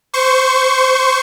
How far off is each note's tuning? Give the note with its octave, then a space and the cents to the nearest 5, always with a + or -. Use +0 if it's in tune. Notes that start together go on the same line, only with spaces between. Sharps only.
C5 -10 C#6 +0